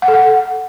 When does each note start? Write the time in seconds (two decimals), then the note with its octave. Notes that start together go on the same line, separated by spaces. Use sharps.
0.02 F#5
0.08 A4
0.14 F#5